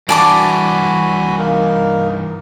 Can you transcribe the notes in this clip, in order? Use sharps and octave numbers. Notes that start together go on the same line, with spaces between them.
G2 E3 F#4 D5 G#5 A5 B5 D6
A#3 D#4 A#4